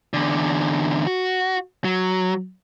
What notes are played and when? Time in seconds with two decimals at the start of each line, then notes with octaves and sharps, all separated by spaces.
0.13 E2 D3
1.07 F#4
1.84 F#3